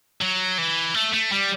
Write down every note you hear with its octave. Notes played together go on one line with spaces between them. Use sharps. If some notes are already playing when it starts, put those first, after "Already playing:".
F#3
E3
A3
A3
G3